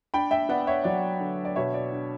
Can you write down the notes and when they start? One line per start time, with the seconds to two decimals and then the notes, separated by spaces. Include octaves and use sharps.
0.14 D4 G5 B5
0.31 E5 G5
0.49 B3 D5 F#5
0.67 C#5 E5
0.84 F#3 D5
1.20 D3
1.45 D5
1.55 B2 C#5 E5
1.74 D5
1.92 D4